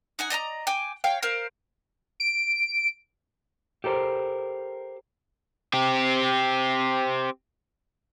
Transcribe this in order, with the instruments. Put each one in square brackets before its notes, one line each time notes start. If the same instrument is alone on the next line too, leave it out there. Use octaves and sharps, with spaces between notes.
[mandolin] D#4 F#5 G#5
D5 D#5 A5 A#5
G5 G#5 D6
C#5 F5 G5
A#4 C5 F5
[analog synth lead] D7
[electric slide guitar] G4 A4 A#4 C5
[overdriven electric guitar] C4 G4